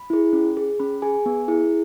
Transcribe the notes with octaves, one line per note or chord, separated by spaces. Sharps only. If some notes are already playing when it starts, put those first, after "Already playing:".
Already playing: B5
E4 G#4
C#4
G#4
C#4 B5
G#4 G#5
B3
E4 G#4